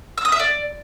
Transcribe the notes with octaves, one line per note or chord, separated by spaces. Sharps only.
E6
D#6
E5
D5